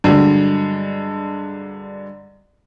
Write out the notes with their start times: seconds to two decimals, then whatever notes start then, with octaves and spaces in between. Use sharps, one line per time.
0.04 G2 D3 F#3 G#3